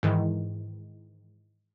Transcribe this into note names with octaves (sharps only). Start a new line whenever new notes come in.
G#2 D#3 E3